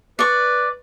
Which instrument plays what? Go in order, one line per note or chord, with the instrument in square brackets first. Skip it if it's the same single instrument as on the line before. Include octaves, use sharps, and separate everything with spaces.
[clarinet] B4 [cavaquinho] D5 C#6